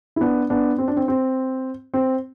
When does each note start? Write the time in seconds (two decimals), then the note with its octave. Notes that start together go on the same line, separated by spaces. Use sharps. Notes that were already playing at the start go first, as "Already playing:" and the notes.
0.16 E4
0.21 B3 D4
0.50 B3 D4
0.78 C4
0.88 D4
0.97 C4
1.08 C4
1.94 C4